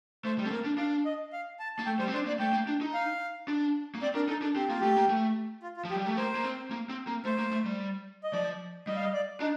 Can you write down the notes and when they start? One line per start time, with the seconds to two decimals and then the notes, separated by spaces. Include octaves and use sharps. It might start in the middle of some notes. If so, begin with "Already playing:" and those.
0.25 A3 C5
0.38 G3
0.45 C4 A4
0.51 A#3 A#4
0.65 D4
0.78 D4 F5
1.05 D#5
1.33 F5
1.60 A5
1.77 A#3 A5
1.86 A3 G5
1.99 G3 C5
2.08 C4
2.14 D4 C5
2.26 A#3 D5
2.40 A3 G5
2.53 A#3
2.67 D4
2.81 D#4
2.94 F5
3.48 D4
3.95 A#3
4.02 C4 D5
4.15 D4 A#4
4.28 D#4 A4
4.42 D4 A4
4.55 C4 G4
4.68 A#3 F4
4.80 A3 G4
4.97 A#3
5.09 A3
5.63 F4
5.77 F4
5.85 F3
5.90 G4
5.95 G3
6.04 A3 G4
6.17 A#3 C5
6.35 A#3
6.44 C4
6.71 A#3
6.89 C4
7.07 A#3
7.25 A3 C5
7.38 A#3
7.51 A3
7.66 G3
8.24 D#5
8.32 F3 D5
8.87 G3 D#5
8.96 F5
9.04 D#5
9.13 D5
9.40 D4 D#4